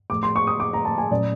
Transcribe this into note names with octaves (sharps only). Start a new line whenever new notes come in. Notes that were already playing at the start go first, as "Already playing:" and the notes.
A2 F3 A3 D6
C6
C#6
D#6
D6
A#5
A5
G#5
A#2 F#3 A3 C#4 D5